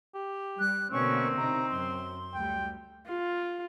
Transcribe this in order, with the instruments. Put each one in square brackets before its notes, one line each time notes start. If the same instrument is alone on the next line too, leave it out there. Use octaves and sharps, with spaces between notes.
[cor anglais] G4
[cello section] G3 [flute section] F#6
[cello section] B2 D3 A#3 [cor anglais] C4 [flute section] C#4 C#6
[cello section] C3 D#4 [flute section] A#5
[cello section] F#2 [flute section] C6
[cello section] D2 G3 [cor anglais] G5
[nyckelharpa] F4